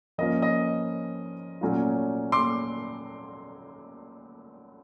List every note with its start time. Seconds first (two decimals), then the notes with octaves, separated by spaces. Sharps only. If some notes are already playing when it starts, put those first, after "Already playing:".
0.18 F3 A#3 C#4 F4 D#5
0.42 D#5
1.61 A#2 F#3 A3 C#4 F4
2.32 C6 D6